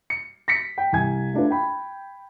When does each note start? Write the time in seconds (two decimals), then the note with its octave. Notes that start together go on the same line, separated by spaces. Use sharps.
0.10 C#7
0.48 A#6 B6 C#7
0.78 G5
0.93 C2 G#5 G#6
1.34 A3 D4 F4 B4
1.51 G5 B5